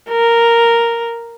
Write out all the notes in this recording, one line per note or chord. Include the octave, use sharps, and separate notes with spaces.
A#4